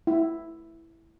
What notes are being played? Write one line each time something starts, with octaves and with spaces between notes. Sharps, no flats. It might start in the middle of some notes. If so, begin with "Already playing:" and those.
E4